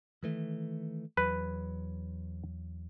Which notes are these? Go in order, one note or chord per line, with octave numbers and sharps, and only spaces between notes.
D#3 E3 A3
E2 F#3 B4